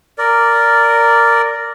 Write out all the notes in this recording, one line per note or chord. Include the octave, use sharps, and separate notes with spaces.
A#4 D5